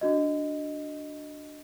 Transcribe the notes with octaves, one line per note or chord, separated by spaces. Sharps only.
D4 F#4 D#5